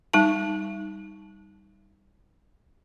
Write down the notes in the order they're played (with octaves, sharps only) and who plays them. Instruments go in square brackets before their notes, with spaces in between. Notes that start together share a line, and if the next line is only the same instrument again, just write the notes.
[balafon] G3 D#4 A5